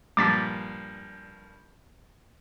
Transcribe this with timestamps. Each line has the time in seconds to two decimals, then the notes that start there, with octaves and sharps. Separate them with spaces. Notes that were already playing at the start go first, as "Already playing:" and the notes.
0.17 G2 A#2 F3 D6 A6 B6